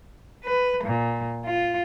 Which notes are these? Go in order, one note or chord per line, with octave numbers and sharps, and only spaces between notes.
B4
A#2
F4